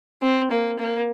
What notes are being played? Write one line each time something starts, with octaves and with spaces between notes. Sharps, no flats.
C4
A#3
A#3